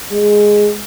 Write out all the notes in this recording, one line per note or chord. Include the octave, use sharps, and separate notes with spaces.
G#3